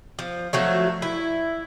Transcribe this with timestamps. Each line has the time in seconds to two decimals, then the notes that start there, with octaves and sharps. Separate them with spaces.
0.19 F3
0.53 F3 F#3 A3
1.02 E4